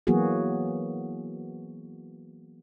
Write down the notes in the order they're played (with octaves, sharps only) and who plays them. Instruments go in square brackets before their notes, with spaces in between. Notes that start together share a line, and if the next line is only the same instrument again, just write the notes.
[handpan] E3 F#3 A#3 B3 F#4 G#4